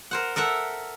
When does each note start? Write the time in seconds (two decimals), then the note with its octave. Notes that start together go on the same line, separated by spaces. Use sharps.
0.11 A#4 C5 F#5
0.36 A4 A#4 E5 F#5